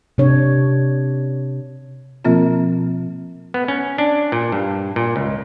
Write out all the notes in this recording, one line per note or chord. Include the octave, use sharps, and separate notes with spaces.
C3 D4 C#5
B2 F3 A#3 C4 F4
B3
C#4
D4
A#2
G2
A#2
C#2